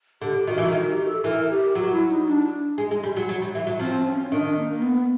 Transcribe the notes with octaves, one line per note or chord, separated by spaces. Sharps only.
D3 G4
D#3 F#4
E3
D#3
F#4
G4
A4
E3 A#4
G4
F#3 F#4
E4
D#4
D4
G#3
G#3
G3
F#3
F#3
G3
E3
F#3
F3 C4
C#4
D#3 D4
D4
A#3
A#3
B3